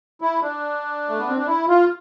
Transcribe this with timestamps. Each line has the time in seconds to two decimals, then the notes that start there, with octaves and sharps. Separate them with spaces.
0.21 E4
0.42 D4
1.09 A3
1.18 B3
1.28 C4
1.38 D4
1.47 E4
1.68 F4